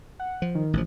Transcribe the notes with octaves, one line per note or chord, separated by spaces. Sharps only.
F#5
F3
D#3
A1 F3